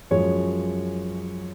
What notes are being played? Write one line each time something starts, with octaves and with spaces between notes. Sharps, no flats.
F#2 F3 G#3 C#5